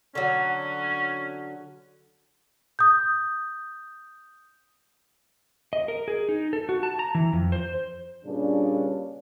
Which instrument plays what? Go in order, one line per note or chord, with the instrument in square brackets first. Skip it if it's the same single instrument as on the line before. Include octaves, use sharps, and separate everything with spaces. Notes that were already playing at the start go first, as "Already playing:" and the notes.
[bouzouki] D3 F#3 [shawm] C#4
[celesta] D#6 G6
[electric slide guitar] D#5
A#4
G#4
D#4
A4
F#4
A5
A#5
E3
F2
C5
[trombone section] G2 A#2 C#3 C#4 D4